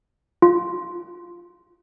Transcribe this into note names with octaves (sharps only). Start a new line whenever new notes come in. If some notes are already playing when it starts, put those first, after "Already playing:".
F4